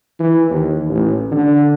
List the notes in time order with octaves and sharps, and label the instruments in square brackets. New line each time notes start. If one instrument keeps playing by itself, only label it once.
[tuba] E3
D#2
A1
D3